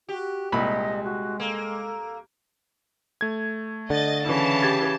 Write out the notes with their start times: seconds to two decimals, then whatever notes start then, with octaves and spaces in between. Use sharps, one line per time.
0.09 F#4 G4
0.52 C2 A#2 G#3 D#5 B5
1.04 F#4
1.40 A#3 A4
3.21 A3 G#6
3.90 D3 D#5 A6
4.25 C#3 E3 A5
4.62 G4 G#6 A6